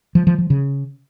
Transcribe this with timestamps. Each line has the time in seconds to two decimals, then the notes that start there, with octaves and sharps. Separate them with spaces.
0.15 F3
0.27 F3
0.38 F3
0.50 C#3